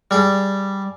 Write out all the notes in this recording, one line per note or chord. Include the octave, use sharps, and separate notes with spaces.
G3 G#4